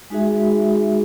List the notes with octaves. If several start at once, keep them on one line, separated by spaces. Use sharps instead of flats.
G#3 D#4 F#4 G#4 E5